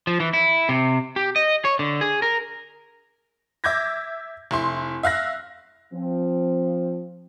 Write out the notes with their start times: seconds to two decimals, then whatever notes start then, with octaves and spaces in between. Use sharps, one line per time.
0.07 F3
0.20 E3
0.33 E4
0.69 C3
1.16 G4
1.36 D#5
1.65 C#5
1.79 D3
2.01 G#4
2.22 A#4
3.64 E5 D6 G6 G#6 A#6
4.51 F1 E4 C6
5.03 E5 F5 F#6 A#6
5.94 F3 C4